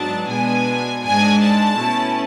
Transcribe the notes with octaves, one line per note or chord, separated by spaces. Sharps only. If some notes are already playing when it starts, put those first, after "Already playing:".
Already playing: G#2 F#3 B3 D4 A5
B2 G#3 B3 D4 G#5
G#2 G#3 D4 G#5
A5
B2 A3 C#4 E4